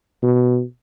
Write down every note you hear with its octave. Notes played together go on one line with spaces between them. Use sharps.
B2